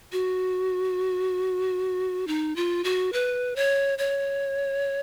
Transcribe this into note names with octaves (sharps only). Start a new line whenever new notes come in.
F#4
D#4
F4
F#4
B4
C#5
C#5